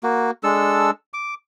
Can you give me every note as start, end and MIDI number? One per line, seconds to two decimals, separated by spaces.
0.03 0.31 58
0.03 0.31 66
0.43 0.91 56
0.43 0.91 62
0.43 0.91 69
0.43 0.91 88
1.14 1.34 86